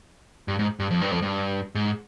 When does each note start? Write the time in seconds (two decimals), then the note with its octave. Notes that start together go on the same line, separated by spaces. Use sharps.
0.48 G2
0.59 G#2
0.80 G2
0.91 F2
1.01 G2
1.11 F2
1.22 G2
1.75 G#2